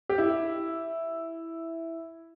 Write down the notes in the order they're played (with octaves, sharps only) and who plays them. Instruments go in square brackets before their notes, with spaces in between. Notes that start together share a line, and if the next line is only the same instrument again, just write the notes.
[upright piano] G4
E4